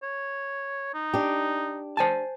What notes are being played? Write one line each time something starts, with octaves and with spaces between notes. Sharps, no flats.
C#5
D#4
D4 G4
C5 G#5 A5